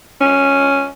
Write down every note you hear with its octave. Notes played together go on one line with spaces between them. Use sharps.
C#4